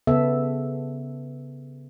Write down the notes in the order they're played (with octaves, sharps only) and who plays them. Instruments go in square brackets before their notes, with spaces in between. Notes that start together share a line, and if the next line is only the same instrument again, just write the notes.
[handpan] C#3 B3 A4 E5